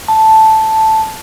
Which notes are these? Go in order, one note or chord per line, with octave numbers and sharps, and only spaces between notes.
A5